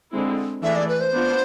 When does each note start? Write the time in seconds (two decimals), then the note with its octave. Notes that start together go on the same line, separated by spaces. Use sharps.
0.11 D3 G#3 C4 E4
0.63 E3 A3 D4 G#4 E5
0.75 D5
0.88 B4
1.01 C5
1.14 B3 D4 F4